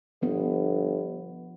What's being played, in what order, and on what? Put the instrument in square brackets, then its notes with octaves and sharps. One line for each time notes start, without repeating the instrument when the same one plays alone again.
[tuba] G1 [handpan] F3 B3